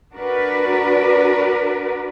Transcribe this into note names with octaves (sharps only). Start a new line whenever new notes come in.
D4 F#4 A#4 B4 D5